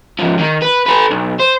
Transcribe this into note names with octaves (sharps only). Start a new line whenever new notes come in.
G#2 F3
D#3
B4
A4 B4
B1
C5